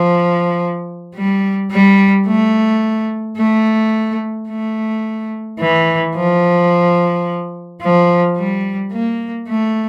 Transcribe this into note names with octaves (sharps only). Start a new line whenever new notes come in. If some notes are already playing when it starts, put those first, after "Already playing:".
Already playing: F3
G3
G3
A3
A3
A3
E3
F3
F3
G3
A#3
A3